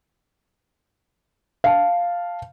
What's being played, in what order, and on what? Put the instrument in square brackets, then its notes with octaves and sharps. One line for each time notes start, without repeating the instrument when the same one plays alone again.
[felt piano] F5 A5